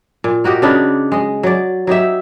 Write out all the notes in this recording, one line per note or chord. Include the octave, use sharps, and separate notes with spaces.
A#2
A#3 F#4 G4 D#5
C#3 D4 D#4 B4
G#3 D#5
F#3 D5
F#3 D#4 G4 E5